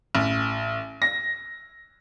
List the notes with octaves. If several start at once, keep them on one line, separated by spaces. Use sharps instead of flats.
A1
A#6